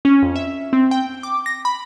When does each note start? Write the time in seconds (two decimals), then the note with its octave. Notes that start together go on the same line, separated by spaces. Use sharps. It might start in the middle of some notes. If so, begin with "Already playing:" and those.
0.05 C#4
0.22 F2
0.36 E5
0.73 C4
0.91 G5
1.23 D6
1.46 A#6
1.65 B5